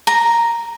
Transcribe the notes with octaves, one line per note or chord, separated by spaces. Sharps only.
A#5